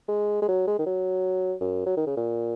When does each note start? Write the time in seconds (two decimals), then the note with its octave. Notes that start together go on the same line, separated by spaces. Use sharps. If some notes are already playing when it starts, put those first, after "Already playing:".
0.08 G#3
0.42 G#3
0.48 F#3
0.67 G#3
0.79 D#3
0.86 F#3
1.61 F#2
1.86 F#3
1.97 D#3
2.07 C#3
2.17 A#2